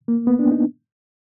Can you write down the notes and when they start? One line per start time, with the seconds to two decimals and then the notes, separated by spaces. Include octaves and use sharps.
0.08 A#3
0.27 B3
0.39 D4
0.52 D#4